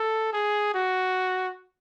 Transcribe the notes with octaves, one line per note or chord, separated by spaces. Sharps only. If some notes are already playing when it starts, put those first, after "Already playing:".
Already playing: A4
G#4
F#4